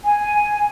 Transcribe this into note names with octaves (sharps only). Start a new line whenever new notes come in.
G#5